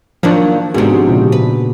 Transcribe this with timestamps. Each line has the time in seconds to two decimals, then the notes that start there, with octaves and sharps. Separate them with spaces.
0.23 D#3 F3 F#3 A#3 D4
0.74 G#2 C3 B3 F#4 G#4
1.08 A#2 C#3
1.32 B4